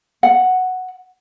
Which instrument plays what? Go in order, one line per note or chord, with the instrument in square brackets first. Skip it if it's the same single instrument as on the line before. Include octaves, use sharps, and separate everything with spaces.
[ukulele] F#5